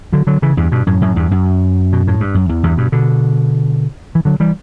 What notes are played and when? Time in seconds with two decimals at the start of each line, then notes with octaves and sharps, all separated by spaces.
0.13 D3 F#3
0.27 D3 F#3
0.42 C#3 E3
0.57 E2 G2
0.72 G2 B2
0.87 F#2 A2
1.01 F#2 A2
1.16 E2 G2
1.31 F#2
1.93 B2
2.08 A2
2.20 G2
2.35 F#2
2.49 E2
2.63 E2 G2
2.77 G2 B2
2.92 B2 D3
4.15 E3
4.25 D3 F#3
4.40 E3 G3